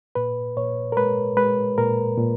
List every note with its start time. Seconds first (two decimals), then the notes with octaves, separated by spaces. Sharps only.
0.15 A#2 B4
0.57 A#2 C#5
0.92 A#4
0.97 G#3 B4
1.37 G#3 B4
1.78 A#2 A#4
2.18 A#2